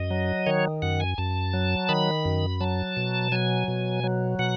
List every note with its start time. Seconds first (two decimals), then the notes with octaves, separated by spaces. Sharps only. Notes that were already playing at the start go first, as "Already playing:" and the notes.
Already playing: F#2 D#5
0.11 F#3
0.46 D#3 C#5
0.82 F#2 F#5
1.00 G#5
1.18 F#2 A5
1.53 F#3
1.89 D#3 B5
2.25 F#2
2.61 F#3 A5
2.97 B2
3.32 F#3 G#5
3.68 B2
4.04 F#3
4.39 B2 F#5